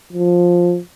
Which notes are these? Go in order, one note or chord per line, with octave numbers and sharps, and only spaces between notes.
F3